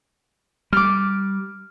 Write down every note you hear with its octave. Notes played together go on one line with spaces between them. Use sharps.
G3 D6 F6